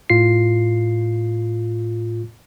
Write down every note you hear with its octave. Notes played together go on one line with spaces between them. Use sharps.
A2 F4 C7